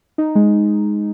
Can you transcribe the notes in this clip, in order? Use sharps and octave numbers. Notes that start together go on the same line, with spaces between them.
D#4
G#3